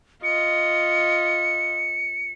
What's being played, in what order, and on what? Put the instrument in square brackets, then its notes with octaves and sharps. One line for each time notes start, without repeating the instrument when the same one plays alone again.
[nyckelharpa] F4 D#5 [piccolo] C#7